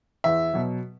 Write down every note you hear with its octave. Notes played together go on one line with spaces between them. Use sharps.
E2 E5
B2 F#3